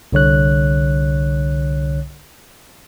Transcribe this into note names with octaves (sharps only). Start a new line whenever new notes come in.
C2 D3 C#5 F#6